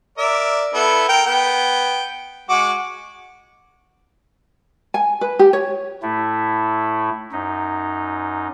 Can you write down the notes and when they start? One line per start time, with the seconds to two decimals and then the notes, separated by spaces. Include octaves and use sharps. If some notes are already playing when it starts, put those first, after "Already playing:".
0.18 A#4 D5 E5
0.74 B3 E4 A4
1.09 A#4 G5
1.26 B3 G5
2.49 G#3 F#4 D6
4.94 G#5
5.21 B4
5.39 G4
5.53 C#5
6.02 A2 A3 E4
7.32 F#2 D#4